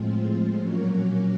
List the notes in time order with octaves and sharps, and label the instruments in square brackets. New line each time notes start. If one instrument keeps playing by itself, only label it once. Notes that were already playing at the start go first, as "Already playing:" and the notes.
Already playing: [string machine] A2 F3 G#3 C4 F4
A#2 F#3 A#3 C#4 F#4